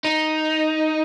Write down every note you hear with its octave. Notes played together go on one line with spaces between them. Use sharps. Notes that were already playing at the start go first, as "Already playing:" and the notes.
D#4